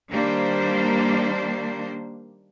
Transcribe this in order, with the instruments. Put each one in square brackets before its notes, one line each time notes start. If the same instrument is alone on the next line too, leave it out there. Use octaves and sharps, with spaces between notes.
[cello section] D#3 G3 A#3 D4 C5